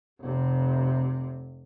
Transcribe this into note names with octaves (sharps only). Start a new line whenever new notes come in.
F1 C3